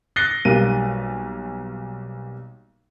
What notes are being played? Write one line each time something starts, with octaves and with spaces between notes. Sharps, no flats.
F#6 A6 A#6 C7 C#7 G7
B1 G3 A#3 D#7